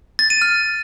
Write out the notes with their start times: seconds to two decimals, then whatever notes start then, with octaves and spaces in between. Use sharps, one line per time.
0.19 A6
0.30 D#7
0.42 F6